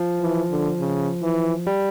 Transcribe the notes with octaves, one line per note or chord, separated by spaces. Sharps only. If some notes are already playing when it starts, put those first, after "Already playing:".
Already playing: F3
E3
D3
C#3
E3
G3